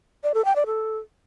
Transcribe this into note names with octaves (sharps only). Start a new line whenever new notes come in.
D5
A4
G5
D5
A4